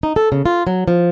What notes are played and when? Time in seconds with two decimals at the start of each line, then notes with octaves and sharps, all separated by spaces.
0.03 D#4
0.16 A4
0.32 C#3
0.46 F4
0.67 F#3
0.88 F3